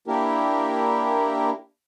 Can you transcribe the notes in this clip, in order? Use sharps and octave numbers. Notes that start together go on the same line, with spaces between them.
A#3 D4 E4 G4 A#4